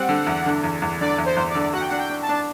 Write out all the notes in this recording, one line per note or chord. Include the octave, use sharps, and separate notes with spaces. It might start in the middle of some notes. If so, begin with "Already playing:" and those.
Already playing: G3 C4 F#5
D3
E2
D3
E2
E2
D3 D5
E2
C5
E2
D5
D3
F#4 F#5
G5
F#5
D4
G5
D4
A5
D4